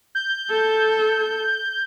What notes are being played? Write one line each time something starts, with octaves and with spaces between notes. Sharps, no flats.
G6
A4